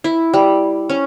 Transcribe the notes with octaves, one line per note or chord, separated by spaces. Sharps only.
E4
G3
C#4